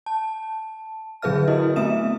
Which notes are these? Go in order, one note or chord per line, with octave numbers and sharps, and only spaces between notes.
A5
D3 F#3 G#4 B4 E5 F6
E4 F#4 A#4 D#5
A3 B3 C4 E5 D#6 E7